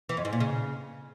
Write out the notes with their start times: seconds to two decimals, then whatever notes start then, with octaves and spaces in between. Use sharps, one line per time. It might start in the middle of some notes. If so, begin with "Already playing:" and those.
0.09 E3
0.17 F2
0.25 G#2
0.33 A#2
0.40 C#3